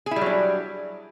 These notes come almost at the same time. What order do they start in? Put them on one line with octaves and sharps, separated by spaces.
G#4 E4 G3 F#3 D4